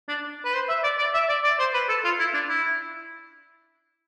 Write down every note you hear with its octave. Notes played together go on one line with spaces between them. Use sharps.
D4
B4
C5
E5
D5
D5
E5
D5
D5
C5
B4
A4
F4
E4
D4
E4